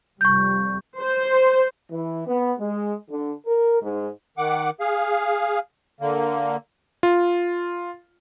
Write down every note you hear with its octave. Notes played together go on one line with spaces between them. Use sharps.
F2 C3 G3 C#6 G6
C5
E3
B3
G#3
D3
A#4
G#2
D#3 F#5 D6
G#4 F5
D3 A#3
F4